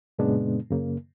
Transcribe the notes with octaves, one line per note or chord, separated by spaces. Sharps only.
F#2 A#2 C#3 G#3 B3 D4
F#2 C#3 A#3